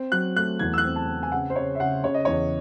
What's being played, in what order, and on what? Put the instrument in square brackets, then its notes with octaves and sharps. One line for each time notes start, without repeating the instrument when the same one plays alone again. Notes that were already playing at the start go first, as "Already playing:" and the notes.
Already playing: [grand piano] C4
F#3 F#6
A3 F#6
E2 G#6
E6
F#6
C4
A5
C4
G#5
C#3 F#5
C5
C#3 C#5
E5
C#3 F#5
C#3 C#5
D#5
E2 C#5